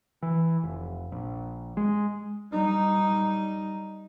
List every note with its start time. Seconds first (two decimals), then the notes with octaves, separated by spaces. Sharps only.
0.23 E3
0.63 F1
1.12 A#1
1.77 G#3
2.52 G3 D#4